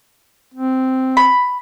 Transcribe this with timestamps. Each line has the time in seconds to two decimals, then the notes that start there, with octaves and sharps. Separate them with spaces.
0.54 C4
1.17 B5